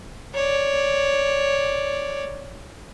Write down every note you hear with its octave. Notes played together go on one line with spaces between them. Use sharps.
C#5 D5